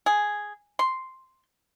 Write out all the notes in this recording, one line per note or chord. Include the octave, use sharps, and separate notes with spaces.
G#4
C6